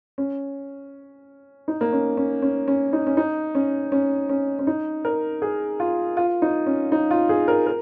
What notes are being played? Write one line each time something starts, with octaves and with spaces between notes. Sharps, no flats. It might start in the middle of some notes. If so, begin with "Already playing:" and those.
C#4
D#4
A#3
C#4
C#4
C#4
C#4
D#4
C#4
D#4
C#4
C#4
C#4
C#4
D#4
A#4
G#4
F4
F4
D#4
C#4
D#4
F4
G#4
A#4
A#4